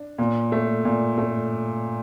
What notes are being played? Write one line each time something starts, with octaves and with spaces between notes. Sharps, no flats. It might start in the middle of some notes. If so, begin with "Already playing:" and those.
Already playing: D4
A#2
A3
A#2
A3